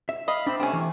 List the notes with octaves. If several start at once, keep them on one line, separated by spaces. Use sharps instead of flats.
E5
D#5 F5 B5 F6
C4 D4 E5 B5
C3 A3 C4 C#4
E3